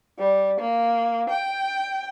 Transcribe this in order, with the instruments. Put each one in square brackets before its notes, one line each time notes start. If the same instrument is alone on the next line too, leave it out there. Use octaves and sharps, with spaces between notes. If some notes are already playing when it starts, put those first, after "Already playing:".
[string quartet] G3
A#3
G5